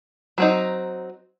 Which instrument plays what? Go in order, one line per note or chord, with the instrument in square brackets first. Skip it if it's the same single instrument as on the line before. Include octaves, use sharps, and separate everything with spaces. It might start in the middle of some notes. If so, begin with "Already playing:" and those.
[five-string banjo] F#3 C4 D#4